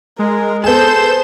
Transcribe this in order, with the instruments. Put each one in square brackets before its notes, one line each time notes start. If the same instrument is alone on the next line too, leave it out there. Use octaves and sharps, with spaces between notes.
[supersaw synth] G#3 [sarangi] A#4
[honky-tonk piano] B3 G#4 [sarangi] A4 [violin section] C5 [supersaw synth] G6 E7